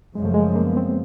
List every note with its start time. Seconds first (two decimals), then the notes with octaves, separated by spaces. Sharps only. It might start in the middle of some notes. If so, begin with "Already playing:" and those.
0.15 F#2 C#3 F3 G#3
0.25 A3
0.34 G#3
0.56 A#3
0.66 B3
0.77 C4